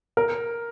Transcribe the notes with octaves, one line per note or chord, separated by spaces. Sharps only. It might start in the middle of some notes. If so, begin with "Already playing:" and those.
A#4